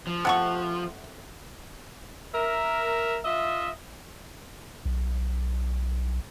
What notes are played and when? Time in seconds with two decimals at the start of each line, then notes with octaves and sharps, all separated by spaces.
0.07 F3
0.25 C3 A3 F#5 C#6
2.34 A#4 E5
3.25 F4 D#5 E5
4.86 B1